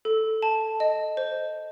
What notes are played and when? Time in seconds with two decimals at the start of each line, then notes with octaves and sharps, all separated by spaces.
0.05 A4
0.43 A5
0.80 D#5
1.17 C5